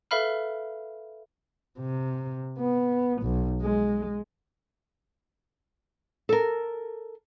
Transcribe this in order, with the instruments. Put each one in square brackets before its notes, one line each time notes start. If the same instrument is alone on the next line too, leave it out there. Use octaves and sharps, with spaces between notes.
[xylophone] A4 B4 E5 F5 B5 F6
[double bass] C3
B3
B1
G#3
[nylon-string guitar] A4 A#4